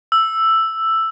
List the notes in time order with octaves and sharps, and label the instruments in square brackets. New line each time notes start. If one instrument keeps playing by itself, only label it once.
[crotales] E6